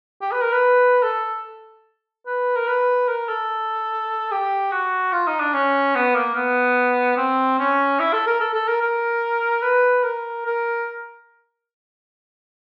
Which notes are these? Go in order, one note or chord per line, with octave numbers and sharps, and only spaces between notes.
G4
B4
A#4
B4
A4
B4
A#4
B4
A#4
A4
G4
F#4
F4
D#4
D4
C#4
B3
A#3
B3
C4
C#4
E4
A4
A#4
A4
A4
A#4
A#4
B4
A#4
A#4